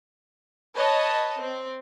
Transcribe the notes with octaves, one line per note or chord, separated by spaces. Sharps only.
B4 C#5 D#5 A5
C4